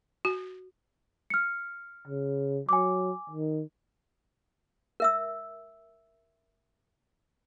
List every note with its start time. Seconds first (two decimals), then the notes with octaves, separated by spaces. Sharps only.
0.25 F#4
1.30 F6 C#7
2.08 C#3
2.69 F#3 G#5 D6
3.30 D#3
5.00 A#4 E5 E6